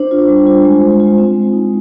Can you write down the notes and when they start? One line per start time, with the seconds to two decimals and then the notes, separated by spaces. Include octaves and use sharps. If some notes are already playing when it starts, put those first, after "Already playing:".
Already playing: D4 C5
0.11 F4
0.28 G3
0.47 F4
0.65 G#3
0.82 G#3
1.00 F4
1.18 C4
1.35 G#3
1.53 D#4